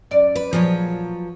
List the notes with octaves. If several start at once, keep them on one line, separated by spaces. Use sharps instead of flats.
F#2 D5
B4
A#2 F3 F#3 G#4 B4 C#5